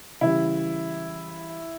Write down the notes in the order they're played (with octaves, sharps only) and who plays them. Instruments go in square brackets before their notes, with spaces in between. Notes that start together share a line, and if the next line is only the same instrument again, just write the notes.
[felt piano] C#3 E3 G3 [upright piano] E4